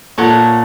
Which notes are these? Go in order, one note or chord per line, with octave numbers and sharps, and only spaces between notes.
A#2 A4 C#5 F#5 A5